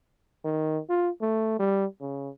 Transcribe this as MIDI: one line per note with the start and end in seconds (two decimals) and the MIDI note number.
0.45 0.80 51
0.90 1.10 65
1.22 1.57 57
1.60 1.85 55
2.01 2.30 49